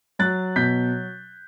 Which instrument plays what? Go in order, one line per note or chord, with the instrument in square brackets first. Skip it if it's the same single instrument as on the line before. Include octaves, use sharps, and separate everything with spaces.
[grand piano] F#3 F#6 A6
B2 G6 B6